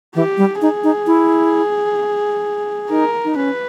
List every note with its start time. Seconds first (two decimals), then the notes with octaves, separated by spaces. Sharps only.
0.15 E3 G4
0.38 G3
0.61 D#4 G#4
0.84 D#4
1.07 E4
2.90 D#4 A#4
3.25 D#4
3.36 C#4 B4